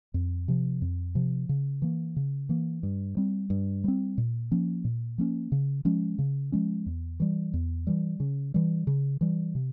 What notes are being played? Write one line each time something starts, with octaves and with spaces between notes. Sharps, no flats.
F2
C3 F3
F2
C3 F3
C#3
E3 A#3
C#3
E3 A#3
G2
G3 C4
G2
G3 C4
A#2
F3 A#3 C#4
A#2
F3 A#3 C#4
C#3
F3 G#3 C#4
C#3
F3 G#3 C#4
E2
E3 G3
E2
E3 G3
C#3
E3 G3
C#3
E3 G3
C3